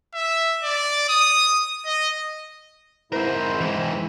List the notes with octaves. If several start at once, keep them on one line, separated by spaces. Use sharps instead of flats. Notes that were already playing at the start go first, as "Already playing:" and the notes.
E5
D5
D#6
D#5
G#2 C4 E4 A#4 C5
E3 G#3